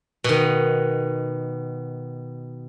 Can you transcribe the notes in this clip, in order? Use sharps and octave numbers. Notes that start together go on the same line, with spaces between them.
B2 D#3